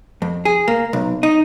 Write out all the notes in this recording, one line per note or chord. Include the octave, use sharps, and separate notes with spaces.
F2
G#4
A#3
B1
D#4